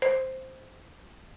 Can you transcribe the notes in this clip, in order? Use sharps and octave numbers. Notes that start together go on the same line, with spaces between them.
C5